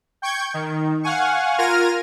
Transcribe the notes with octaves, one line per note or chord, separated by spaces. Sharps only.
G5 C#6 G6 G#6
D#3
F5 F#5 G#5 C#6
F4 A#4 F6 G#6 A#6 D#7